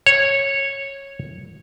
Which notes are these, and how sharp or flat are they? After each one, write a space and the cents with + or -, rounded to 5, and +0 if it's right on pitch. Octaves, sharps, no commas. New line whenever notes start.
C#5 -10